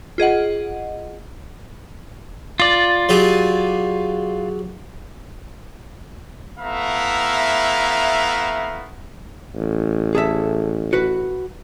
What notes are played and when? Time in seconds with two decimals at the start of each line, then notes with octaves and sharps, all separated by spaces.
0.18 F4 G#4 D#5 F#5
2.60 F4 D5
3.09 F#3 G4 G#4
6.59 A3 B3 E4 E5 F5 A#5
9.55 A1
10.15 G#4 A4 E5
10.93 F#4 B4